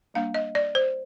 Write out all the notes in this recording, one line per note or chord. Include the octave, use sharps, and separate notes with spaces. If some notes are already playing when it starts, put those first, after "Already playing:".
G3 A#3 D4 F5
D#5
D5
C5